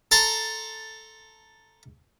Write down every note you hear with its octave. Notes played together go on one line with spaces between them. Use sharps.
A4 A5 A#5 C6